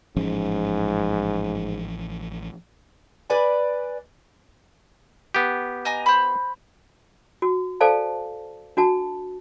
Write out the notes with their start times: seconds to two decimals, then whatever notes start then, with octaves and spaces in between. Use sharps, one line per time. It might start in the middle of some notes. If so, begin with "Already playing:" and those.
0.16 A1 G#2 F3 C#4
3.30 B4 D5 G#5
5.34 B3 G4
5.85 D#5 G#5 A#5
6.06 C5 B5
7.42 F#4
7.81 A4 C5 D5 F5 G#5 A5
8.77 D4 F#4 A5